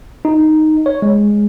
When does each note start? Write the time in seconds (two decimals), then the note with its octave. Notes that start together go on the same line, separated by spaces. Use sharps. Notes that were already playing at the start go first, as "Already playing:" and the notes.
0.25 D#4
0.86 C#5
1.02 G#3